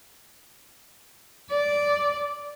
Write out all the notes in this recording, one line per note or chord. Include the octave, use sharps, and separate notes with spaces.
D5